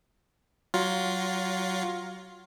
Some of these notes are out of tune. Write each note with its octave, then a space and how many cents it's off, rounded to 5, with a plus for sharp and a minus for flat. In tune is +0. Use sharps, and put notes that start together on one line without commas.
F#3 +20 F4 +15